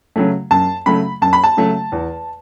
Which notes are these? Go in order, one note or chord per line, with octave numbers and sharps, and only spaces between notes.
C#3 F#3 A3
F#2 A5
C#3 F#3 A3 B5
F#2 A5
B5
A5
C#3 F#3 A3
E2